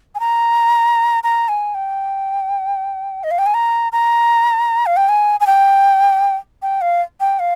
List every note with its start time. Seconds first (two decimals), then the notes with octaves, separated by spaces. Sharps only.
0.15 G#5
0.20 A#5
1.23 A#5
1.48 G#5
1.74 G5
3.24 D#5
3.31 F5
3.38 G5
3.46 G#5
3.54 A#5
3.92 A#5
4.86 F5
4.97 G5
5.09 G#5
5.40 G#5
5.47 G5
6.62 G5
6.81 F5
7.20 G5
7.39 F5